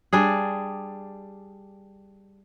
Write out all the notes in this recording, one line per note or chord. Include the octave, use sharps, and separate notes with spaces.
G3 D4 G#4